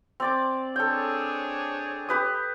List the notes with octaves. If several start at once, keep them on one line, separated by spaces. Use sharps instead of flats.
C4 D5 D6
D4 G#4 A4 C#5 G5
G4 B4 D#6